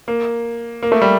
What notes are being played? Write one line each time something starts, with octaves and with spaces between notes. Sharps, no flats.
A#3
A#3
A3
G3